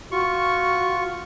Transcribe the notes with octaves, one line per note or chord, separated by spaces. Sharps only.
F4 F#4 C#6